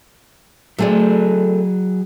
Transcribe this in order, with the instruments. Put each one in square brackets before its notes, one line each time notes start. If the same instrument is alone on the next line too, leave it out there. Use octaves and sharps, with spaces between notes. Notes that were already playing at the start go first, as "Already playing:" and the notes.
[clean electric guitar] F#3 G#4 [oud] A3 C4 D4